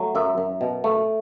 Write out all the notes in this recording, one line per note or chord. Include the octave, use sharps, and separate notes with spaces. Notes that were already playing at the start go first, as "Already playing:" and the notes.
Already playing: F#3 A3
F#2 E5
F#2
B2
A3